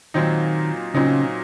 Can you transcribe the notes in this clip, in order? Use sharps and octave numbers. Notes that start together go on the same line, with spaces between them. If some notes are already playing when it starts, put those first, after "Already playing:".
A#2 D#3 F#3 C4 D#4
A#2 C#3 F#3 C4 D#4